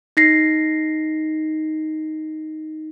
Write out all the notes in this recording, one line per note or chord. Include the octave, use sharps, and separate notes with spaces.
D#4 A#6 C7